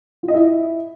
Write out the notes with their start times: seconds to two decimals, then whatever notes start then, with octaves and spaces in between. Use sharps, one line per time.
0.23 F4
0.28 D#5
0.34 E4